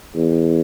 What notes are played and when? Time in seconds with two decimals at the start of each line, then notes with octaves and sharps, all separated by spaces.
0.16 E2